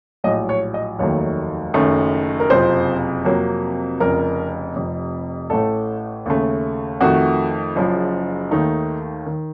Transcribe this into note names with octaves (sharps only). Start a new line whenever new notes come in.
A#1 A2 F#3 D#5
C#5
D#5
F1 D#2 D#3 F#3 A3 C#5
F#1 F#2 D#3 A3
A#4
F#1 F2 C3 F3 C5
F2 C3 F#3 A#3
F1 F2 C#3 A#4
F1 F2 C3
A1 A2 A3 A4
D#2 C#3 A3
F2 D#3 A3 F#4
F#1 F#2 C#3 F3
D#2 D#3 A3 D#4
D#3